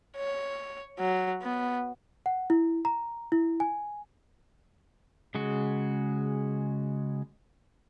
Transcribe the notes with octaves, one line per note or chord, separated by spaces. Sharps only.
C#5
F#3
B3
F#5
E4
A#5
E4
G#5
C#3 G#3 F#4